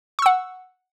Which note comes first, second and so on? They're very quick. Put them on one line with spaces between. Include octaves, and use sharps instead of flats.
C#6 E6 F#5